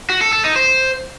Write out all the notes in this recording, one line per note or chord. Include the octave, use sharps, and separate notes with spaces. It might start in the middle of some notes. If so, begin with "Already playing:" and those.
F#4
A4
A4
D#4
C5